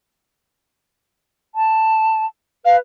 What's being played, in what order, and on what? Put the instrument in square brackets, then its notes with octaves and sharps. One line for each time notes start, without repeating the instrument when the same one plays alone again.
[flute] A5
[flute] B4 [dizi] F5